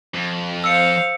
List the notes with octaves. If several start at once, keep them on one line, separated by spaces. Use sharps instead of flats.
F2
C5 F5 E6 C#7